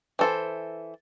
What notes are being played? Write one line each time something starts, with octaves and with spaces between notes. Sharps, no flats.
E3 A4 C5